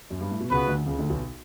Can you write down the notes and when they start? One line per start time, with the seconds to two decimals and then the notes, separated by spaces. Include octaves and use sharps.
0.10 F#2
0.20 G2
0.31 A2
0.40 B2
0.50 C#2 C#3 B3 F#4 B4
0.67 D2 D3
0.86 C#2 C#3
0.98 D2 D3
1.10 B1 B2